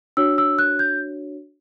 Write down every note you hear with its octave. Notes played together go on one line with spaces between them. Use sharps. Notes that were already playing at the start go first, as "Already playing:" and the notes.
D4 F#4 C#5 E6
E6
F#6
G6